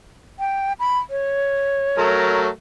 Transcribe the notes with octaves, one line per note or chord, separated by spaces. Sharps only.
G5
B5
C#5
F#3 A3 A#4